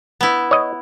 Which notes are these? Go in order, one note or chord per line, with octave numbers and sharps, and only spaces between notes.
B3 E4
C#5 D#5